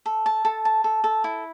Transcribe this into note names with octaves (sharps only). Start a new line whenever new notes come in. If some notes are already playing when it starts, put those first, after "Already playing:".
A4
A5
A4
A5
A4
A4
E4